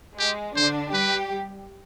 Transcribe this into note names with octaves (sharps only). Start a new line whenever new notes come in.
G#3 G4
D3 D4 C5
G3 G4 B4